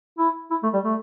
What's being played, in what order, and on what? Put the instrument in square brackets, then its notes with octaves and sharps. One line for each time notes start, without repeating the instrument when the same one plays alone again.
[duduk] E4
E4
A3
G3
A3